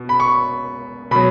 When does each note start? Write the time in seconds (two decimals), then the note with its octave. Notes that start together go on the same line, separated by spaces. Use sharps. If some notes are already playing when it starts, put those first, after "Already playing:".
Already playing: B2
0.09 B5
0.20 C#6
1.11 B2 F#3 B5